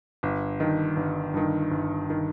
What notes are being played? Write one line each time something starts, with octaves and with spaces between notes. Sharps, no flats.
G1
G2 D#3
G1
G2 D#3
G1
D#3